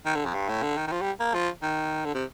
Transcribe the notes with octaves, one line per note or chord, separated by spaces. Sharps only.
D#3
D3
F2
G2
A2
D3
D#3
D#3
F3
G3
A#3
F3
D#3
D3
C3